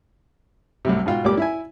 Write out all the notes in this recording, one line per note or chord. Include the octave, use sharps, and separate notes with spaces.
C2 F#2 A2 C3
G#2 B2 F4 G5
C#2 A#2 G3 G4 D6
E4 E5 G#5